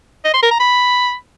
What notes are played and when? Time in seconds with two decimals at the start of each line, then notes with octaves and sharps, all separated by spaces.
0.25 D#5
0.34 C6
0.42 A#4
0.51 A#5
0.60 B5